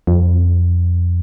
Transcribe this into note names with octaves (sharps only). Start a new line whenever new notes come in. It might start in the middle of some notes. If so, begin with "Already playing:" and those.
F2